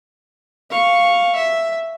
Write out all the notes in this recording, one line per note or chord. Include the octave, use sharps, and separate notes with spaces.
F5 C#6
E5